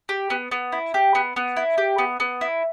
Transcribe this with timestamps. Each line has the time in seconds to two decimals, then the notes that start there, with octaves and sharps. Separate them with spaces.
0.09 G4
0.30 B3
0.51 B3
0.72 E4
0.94 G4
1.15 B3
1.36 B3
1.57 E4
1.78 G4
1.98 B3
2.20 B3
2.41 E4